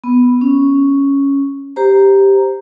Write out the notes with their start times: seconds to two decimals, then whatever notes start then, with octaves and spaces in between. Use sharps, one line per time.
0.04 B3
0.41 C#4
1.76 G4 C5 A#5